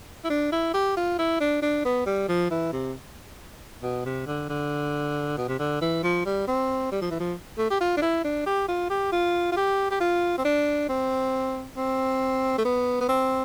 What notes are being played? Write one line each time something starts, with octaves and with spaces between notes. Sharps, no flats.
E4
D4
E4
G4
F4
E4
D4
D4
B3
G3
F3
E3
C3
B2
C3
D3
D3
B2
C3
D3
E3
F3
G3
C4
G3
F3
E3
F3
A3
G4
F4
D4
E4
D4
G4
F4
G4
F4
F4
G4
G4
F4
C4
D4
C4
C4
A3
B3
B3
C4